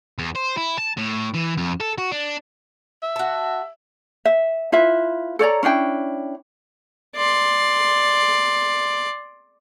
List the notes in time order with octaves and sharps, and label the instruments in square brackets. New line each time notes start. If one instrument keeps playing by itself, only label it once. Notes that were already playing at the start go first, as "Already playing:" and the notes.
[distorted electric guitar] E2
C5
E4
A5
A2
E3
F2
A4
F#4
D4
[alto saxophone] E5
[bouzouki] F#4 A5
[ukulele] E5
E4 F4 B4 E5
A4 C#5 D5 A#5
C#4 D4 E4 G5
[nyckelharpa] D5 C6